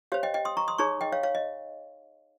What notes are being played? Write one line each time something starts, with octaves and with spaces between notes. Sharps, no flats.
G4 C5 C#5 F5
D#5 G5
D#5 G5
C6 D#6
A#5 C#6
C6 D#6
D#4 G#4 C#5 A#5 C#6
D#5 G5
C#5 F5
C#5 F5
D#5